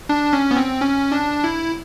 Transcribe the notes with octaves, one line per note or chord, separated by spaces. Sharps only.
D4
C#4
B3
C4
C#4
D4
E4